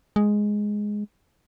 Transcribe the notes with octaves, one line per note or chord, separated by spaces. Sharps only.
G#3